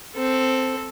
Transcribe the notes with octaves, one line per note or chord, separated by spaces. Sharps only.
C4 A4